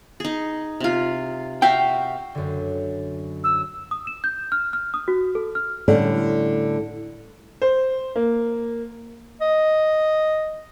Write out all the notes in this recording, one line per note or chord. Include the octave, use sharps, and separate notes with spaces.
D#4 G#4
C3 F4
F#4 E5 F5 G5
F#2 D3
E6
D#6
E7
G6
F6
F6
D#6
F#4
A4
F6
A2 D3 G3 C#4
C5
A#3
D#5